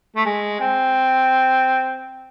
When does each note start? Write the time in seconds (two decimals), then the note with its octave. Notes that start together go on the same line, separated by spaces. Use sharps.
0.16 A3
0.25 G#3
0.60 C4